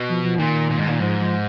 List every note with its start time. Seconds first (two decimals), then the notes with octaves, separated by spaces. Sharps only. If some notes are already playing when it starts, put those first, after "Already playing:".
Already playing: B2
0.09 F3
0.24 F3
0.38 A#2 D#3
0.69 A#2
0.78 G#2
0.87 A#2
1.00 G#2 F3
1.20 F3